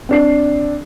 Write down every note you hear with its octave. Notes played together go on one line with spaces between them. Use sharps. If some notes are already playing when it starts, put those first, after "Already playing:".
C4 D4 C7